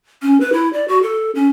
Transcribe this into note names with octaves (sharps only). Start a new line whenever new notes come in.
C#4
B4
E4
D5
F#4
A4
C#4